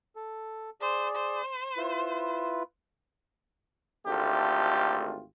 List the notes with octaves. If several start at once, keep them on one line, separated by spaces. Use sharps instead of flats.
A4
G#4 C5 D5
C5
E4 F4 B4
G#1 D2 A3 F4 G4